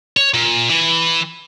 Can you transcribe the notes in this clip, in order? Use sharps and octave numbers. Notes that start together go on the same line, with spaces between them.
C#5
A#2
E3